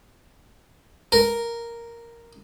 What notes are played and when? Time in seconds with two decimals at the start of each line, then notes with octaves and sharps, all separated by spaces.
1.12 A#4